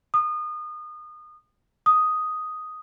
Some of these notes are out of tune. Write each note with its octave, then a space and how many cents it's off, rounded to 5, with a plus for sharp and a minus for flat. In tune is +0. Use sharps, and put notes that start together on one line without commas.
D#6 -30
D#6 +5